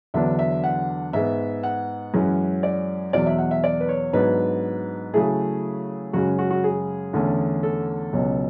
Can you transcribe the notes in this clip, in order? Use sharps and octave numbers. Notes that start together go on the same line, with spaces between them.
E2 D3 F#3 B3 D4 E5
E5
F#5
G#2 G#3 B3 E5
F#5
F#2 E3 G#3 C#4
D5
E2 B2 F#3 D5
E5
F#5
E5
D5
B4
C#5
G#2 F#3 B3 D4 B4
C#3 F#3 A3 C#4 E4 G#4
F#2 C#3 G#3 C#4 F#4
F#4
F#4
G#4
E2 D3 A3 C#4
A4
C#2 B2 F#3 C#4